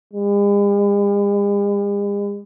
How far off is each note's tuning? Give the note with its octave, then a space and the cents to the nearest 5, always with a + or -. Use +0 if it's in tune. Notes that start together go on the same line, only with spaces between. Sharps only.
G#3 -45